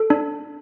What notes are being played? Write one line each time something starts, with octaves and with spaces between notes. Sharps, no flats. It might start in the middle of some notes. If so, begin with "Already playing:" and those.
Already playing: A4
D4